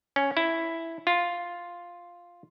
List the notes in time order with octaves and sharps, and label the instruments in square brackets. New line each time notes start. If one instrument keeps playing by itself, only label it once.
[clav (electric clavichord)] C#4
E4
F4